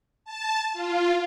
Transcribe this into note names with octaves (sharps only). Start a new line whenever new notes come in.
A5
F4